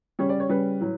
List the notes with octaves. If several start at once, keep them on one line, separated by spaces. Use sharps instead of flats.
C#3 G3 C#4 C#5
D5
C#5
C#3 G3 C#4 B4
A2 F#3